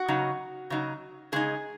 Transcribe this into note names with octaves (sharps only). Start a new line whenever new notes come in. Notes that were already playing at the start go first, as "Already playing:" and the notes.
Already playing: F#4
C#3 F#3 D#4
C#3 F#3 D#4
C#3 G#3 D#4 G#4